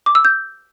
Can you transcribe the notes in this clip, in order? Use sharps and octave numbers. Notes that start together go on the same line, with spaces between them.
D6
E6
G6